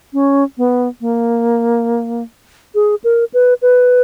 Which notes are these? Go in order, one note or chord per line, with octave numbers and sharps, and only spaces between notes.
C#4
B3
A#3
G#4
A#4
B4
B4